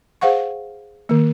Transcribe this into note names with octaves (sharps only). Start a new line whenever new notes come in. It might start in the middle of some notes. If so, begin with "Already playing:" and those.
G#4 C5 F5 F#5 C#6
D#3 A#3